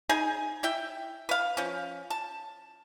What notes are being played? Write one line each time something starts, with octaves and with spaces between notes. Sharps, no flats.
D#4 G#4 G#5
E4 E5 G5
B4 F5
F3 C#4
A5